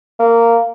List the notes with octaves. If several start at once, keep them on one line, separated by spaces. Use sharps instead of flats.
A#3